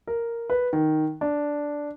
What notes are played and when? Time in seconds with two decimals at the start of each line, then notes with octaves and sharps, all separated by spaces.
0.07 A#4
0.50 B4
0.73 D#3
1.21 D4